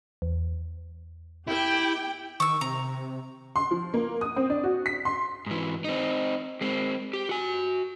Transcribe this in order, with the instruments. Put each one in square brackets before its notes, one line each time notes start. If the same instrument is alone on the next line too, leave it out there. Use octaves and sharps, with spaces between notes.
[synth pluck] E2
[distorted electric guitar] E4 [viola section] G4 G5
[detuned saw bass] D#3 [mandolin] C#6 E6
[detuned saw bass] C3 [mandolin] A#5
[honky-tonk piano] C6
F3
A#3
D#6
C4
D4
F#4
B6
C6
[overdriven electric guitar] G#2 E3
C4 D#4
G#3 C4
G4
F#4 G#5